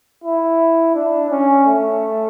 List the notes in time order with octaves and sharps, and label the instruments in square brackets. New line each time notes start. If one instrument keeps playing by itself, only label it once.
[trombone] E4
D4
C#4
A3